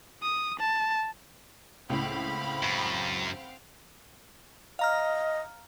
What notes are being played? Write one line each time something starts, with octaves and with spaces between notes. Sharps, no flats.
D#6
A5
C#2 A2 C4 F5 F#5 B5
F#2
D#5 F5 A#5 F6